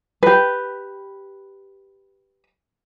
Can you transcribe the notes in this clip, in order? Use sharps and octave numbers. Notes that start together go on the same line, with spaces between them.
G4 B4